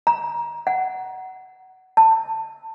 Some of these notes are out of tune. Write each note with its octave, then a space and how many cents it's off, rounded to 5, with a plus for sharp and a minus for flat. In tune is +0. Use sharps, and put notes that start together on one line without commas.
A#5 +20
F#5 +20
A5 +20